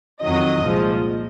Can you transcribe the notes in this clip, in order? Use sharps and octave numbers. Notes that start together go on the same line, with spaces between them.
F2 D#3 F#3 D#5
C2 A#2 F3 G#3